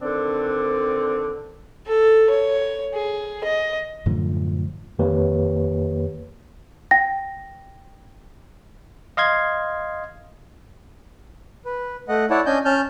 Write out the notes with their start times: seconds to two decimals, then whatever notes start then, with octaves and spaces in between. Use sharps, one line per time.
0.01 D3 D#3 C4 D4
1.86 A4
2.30 C#5
2.93 G#4
3.44 D#5
4.06 F#2 A2 D3 F3
4.99 F2 D#3 A#3 G4 B4 C#5
6.91 G5 A#6
9.17 D#5 F5 C6 G#6
11.65 B4
12.08 A3 D#5 F#5
12.30 E4 C#5 D5 F#5 A5
12.46 C#4 D4 D#5 G#5 G6
12.65 C#4 A5 F6 G6